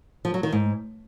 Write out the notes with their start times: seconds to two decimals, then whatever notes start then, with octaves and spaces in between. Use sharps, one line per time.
0.25 F3
0.34 F#3
0.43 D#3
0.52 G#2